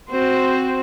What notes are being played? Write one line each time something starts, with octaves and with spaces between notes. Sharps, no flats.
C4 F#4 C5